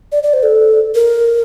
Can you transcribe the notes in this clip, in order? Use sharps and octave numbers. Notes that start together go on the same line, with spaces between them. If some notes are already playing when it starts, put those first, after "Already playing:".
D5
D5
C5
A4
A#4